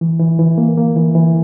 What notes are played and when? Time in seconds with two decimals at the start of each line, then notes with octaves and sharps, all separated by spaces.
0.01 E3
0.19 E3
0.39 E3
0.58 A#3
0.77 A#3
0.96 E3
1.15 E3